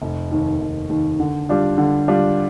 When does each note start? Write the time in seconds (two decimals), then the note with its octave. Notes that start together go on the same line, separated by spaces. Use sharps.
0.02 F1
0.31 D#2 D#3
0.61 F1
0.89 D#2 D#3
1.20 D3
1.49 G3 D4 F4
1.78 D3
2.08 G3 D4 F4